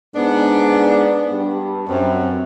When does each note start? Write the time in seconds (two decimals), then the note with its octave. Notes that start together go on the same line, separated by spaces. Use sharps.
0.15 G#2 B3 D4
1.31 G2
1.89 F#2 C4